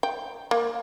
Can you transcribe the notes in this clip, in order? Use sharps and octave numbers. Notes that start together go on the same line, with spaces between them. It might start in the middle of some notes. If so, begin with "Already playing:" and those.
G5
A#3